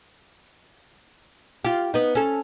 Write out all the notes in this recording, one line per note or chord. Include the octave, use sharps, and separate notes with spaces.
F4 G4
B3 D#4
C#4 A4